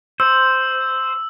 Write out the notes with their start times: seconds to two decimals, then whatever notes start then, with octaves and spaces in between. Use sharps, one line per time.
0.20 C5 E6